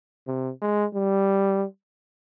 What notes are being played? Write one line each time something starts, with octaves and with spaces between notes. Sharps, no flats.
C3
G#3
G3